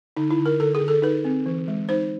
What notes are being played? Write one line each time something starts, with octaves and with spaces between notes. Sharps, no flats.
D3 D#4
E4
D3
A#4
D3 A4
G#4
D3
A4
D#4 B4
C4
E3
G#3
D#4 C5